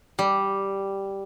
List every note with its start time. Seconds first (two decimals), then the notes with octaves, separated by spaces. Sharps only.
0.19 G3